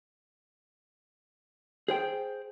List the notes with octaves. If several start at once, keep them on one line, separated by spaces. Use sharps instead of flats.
G#4 C5 G5